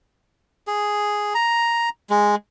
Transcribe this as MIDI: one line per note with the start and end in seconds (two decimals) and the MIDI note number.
0.67 1.34 68
1.35 1.89 82
2.10 2.35 56